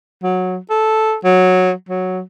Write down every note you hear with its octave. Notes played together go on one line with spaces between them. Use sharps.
F#3
A4
F#3
F#3